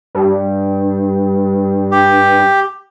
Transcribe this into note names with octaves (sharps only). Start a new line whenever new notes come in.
G2
G4